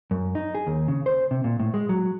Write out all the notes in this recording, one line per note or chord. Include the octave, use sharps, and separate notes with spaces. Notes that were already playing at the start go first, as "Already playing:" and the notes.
F#2
D#4
G#4
D#2
C#3
C5
C3
A#2
A2
G#3
F#3